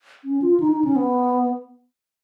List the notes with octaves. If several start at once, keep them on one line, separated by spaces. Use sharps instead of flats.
C#4
F4
D#4
D#4
C#4
B3